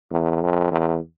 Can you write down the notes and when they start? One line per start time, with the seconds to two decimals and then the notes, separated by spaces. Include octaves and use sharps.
0.11 E2
0.42 F2
0.72 E2